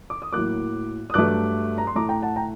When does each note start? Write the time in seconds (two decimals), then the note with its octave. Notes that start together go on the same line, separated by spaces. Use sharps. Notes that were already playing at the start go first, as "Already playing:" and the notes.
0.10 D6
0.22 D#6
0.33 A2 F#3 A#3 D6 F#6
1.10 D#6
1.14 G2 F#3 A3 D6 F#6
1.78 A#5
1.87 C6
1.95 A2 A3 A#5 D6
2.09 G5 A#5
2.22 F#5 A5
2.36 G5 A#5